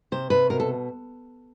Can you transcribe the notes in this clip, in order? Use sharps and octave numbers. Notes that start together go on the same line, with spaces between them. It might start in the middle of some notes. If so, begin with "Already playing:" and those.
C3 C5
C3 B4
B2 A#4
A4